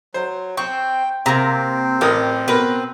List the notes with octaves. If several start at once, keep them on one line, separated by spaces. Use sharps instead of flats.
F#3 C5
C4 G5 C#6
C3 A#3 C4 A#5
A1 G4 A#4 D#6
B2 A#4 B4